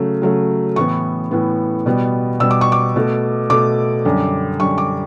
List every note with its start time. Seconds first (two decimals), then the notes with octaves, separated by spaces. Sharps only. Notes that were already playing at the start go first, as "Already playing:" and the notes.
Already playing: C#3 F#3 A3
0.22 C#3 F#3 A3
0.76 A2 E3 B3 C#6
1.31 A2 E3 B3
1.86 B2 G3 B3
2.40 B2 G3 B3 E6
2.51 D6
2.61 C#6
2.72 D6
2.96 B2 A3
3.50 B2 A3 D6
4.05 F#2 D3 G3
4.60 F#2 D3 G3 C#6
4.78 D6